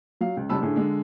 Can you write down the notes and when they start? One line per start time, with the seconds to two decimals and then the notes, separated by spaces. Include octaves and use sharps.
0.21 F#3 F5
0.37 C#2
0.49 F#1 C#2 G3 A5 B5 E6
0.62 A2 D3 G#4
0.76 D3 G#3